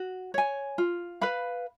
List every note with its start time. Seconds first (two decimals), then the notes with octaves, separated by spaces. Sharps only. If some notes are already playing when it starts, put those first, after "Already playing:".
Already playing: F#4
0.34 C#5 G#5
0.78 F4
1.21 B4 F5 B5